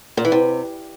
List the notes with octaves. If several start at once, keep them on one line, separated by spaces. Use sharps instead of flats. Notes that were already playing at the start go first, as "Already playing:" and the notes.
A#2
E3
C3